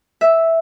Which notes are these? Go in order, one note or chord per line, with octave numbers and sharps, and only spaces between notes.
E5